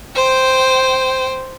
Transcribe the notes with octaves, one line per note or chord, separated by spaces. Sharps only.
C5 G5